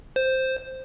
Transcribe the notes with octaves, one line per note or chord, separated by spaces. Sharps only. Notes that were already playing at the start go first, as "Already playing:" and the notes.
C5